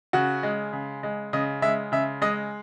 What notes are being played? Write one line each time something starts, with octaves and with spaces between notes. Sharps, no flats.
C#3 F#4 F#5
G#3
C#3
G#3
C#3 D#5
G#3 E5
C#3 E5
G#3 D#5